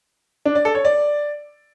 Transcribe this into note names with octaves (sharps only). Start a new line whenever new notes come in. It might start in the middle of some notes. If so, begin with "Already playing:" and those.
D4
D5
A4
C#5
D5